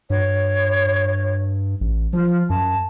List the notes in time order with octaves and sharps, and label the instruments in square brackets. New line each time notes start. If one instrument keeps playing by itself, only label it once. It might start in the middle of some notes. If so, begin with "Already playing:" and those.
[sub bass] G2 [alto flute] C#5
[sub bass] A1
[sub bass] F3 [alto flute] F4
[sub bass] F#2 [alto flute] A5